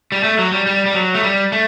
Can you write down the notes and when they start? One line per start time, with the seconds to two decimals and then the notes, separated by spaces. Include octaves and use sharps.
0.12 G3
0.24 A3
0.39 F#3
0.52 G3
0.66 G3
0.86 G3
0.94 F#3
1.14 A3
1.23 G3
1.52 A3